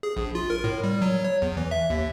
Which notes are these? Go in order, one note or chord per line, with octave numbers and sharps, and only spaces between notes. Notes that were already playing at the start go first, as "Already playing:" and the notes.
G#4
A#1
F4
A#4
A2
G3
F#3
C#5
E2
E3
E5
D#2